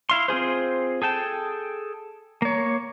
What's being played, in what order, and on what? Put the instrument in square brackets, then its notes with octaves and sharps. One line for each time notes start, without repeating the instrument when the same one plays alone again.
[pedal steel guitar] E4 F5 C6
C4 F4 G#4 C5
G#4 A4 G5 A5
A#3 C#5